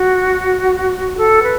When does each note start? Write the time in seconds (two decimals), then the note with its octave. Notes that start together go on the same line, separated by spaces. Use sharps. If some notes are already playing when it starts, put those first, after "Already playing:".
Already playing: F#4
1.18 A4
1.43 B4